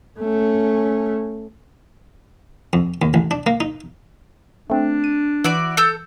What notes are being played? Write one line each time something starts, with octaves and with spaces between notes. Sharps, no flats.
A3 C#4
F2
D#2
A1
D4
A#3
D#4
A3 C4 D4
D#7
E3 E4 F#4 D5
A4 E6 G6